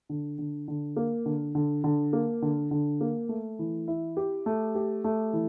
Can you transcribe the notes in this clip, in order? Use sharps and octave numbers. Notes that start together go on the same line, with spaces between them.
D3
D3
D3
A#3
D3
D3
D3
A#3
D3
D3
A#3
A3
E3
E4
G4
A3
G4
A3
E3